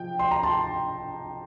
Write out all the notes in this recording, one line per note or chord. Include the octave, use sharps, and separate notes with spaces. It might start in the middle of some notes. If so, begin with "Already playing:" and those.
Already playing: F3 G5
C6
A#5
A5 C6